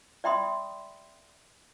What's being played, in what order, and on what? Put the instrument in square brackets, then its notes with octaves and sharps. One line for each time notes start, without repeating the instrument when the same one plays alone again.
[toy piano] D5 E5 G5 B5 C6 D#6